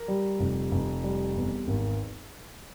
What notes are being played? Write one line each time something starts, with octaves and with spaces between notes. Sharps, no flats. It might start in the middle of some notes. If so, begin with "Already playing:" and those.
Already playing: A#4
G3
F1
F1
G3
E2
G#1